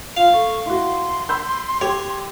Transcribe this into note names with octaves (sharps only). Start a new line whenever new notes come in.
F4 F5
A4 C#6
E4 F#4 C6
B5 E6 G6
G4 C#5